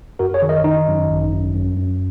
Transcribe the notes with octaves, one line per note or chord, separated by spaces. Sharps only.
F#2 F#4 A#4
G#4 C#5
D#3
A#4 D#5
D#3 D#4
F#2
G#1
F#2
F#2
F#2